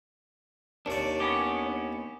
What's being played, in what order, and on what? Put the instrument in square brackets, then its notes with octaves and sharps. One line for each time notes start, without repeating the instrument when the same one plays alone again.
[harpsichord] D#2 D5 [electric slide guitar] D4 C#5
[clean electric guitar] B3 C#4 G4